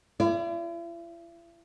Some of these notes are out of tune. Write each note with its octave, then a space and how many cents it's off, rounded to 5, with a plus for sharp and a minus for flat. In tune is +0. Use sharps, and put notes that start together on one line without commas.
E4 +45 D5 +0